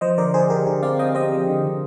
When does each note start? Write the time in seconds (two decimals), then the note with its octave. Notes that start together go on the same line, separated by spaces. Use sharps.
0.01 F3 C5 D#5
0.18 D3 A#4 D5
0.34 D3 G#4 C5
0.50 D3 G4 A#4
0.66 D3 G#4
0.83 C4 D5 F5
0.99 C4 D#5 G5
1.15 C4 C5 D#5
1.32 F3
1.47 D3
1.64 D3